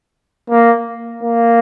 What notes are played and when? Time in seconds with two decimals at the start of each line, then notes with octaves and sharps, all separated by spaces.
0.50 A#3
1.23 A#3